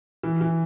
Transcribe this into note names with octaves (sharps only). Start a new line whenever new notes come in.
E3
E3